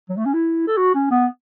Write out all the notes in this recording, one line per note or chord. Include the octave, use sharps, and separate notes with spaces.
F#3
A3
C#4
E4
A4
F#4
C#4
B3